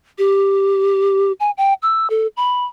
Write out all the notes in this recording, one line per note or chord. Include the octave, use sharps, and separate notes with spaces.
G4
G#5
G5
E6
A4
B5